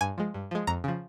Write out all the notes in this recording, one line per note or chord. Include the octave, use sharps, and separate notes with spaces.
G2 G#5
F3 G#3
G2
F3 G#3
F2 A#5
C#3 F3